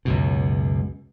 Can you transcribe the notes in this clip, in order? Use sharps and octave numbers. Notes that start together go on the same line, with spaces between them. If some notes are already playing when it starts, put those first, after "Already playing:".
C#2 F#2 B2